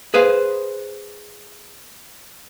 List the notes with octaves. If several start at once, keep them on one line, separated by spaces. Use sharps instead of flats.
G#4 B4 C5 F5